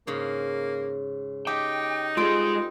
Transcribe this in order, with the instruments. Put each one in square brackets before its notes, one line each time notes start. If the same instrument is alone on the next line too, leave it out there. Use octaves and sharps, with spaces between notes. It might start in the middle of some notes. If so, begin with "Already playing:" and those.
[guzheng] G#2 C#3 [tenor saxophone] A#3
[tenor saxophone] D#4 [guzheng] G4 [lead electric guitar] G5 [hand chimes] D6
[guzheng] G3 C4 A4 [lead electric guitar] G#3 G#4 [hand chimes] F4 C6 D7